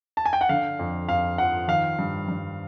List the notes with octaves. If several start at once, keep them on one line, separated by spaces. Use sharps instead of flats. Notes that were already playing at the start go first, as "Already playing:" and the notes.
A5
G#5
G5
F#5
D3 F5
F2
F2 F5
F3 F#5
D#3 F5
G2
G2